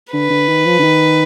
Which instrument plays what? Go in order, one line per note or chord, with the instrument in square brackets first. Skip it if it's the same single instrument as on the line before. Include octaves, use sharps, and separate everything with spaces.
[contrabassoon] D3 [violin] B4
[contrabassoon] D3
D#3
F3
D3
D#3